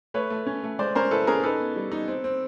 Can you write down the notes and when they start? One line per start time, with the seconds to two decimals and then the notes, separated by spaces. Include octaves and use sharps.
0.14 A3 B4 C#5
0.30 A3
0.47 C#4
0.63 A3
0.79 G#3 C5 D5
0.95 C#4 A#4 C5
1.11 E4 A4 B4
1.27 C#4 G#4 A#4
1.43 D#4 A4 B4
1.60 B3
1.76 G3
1.92 D#4
2.08 C4
2.24 C4